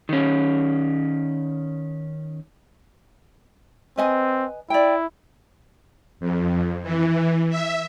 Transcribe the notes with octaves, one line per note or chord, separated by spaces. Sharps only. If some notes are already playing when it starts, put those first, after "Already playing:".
D#3 C#4
C4 B4 D#5 G#5
E4 D5 G5
F2
E3
E5